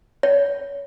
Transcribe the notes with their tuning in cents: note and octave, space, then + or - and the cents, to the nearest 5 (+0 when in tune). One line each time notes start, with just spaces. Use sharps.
C#5 +25